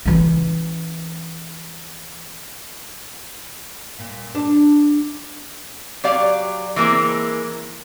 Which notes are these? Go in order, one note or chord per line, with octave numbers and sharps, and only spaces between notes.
E3 C#4
A#2
D4
F#3 G4 D5 F5
E3 G#3 A#3 C4